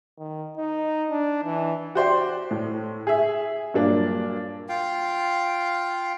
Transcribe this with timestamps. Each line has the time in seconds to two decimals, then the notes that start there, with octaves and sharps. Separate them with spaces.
0.18 D#3
0.57 D#4
1.10 D4
1.45 E3
1.95 F#4 G4 C5 D5 G5 C6
2.51 A2
3.07 G#4 E5
3.74 G2 A#2 F#3 A#3 D4
4.69 F4 F5 G5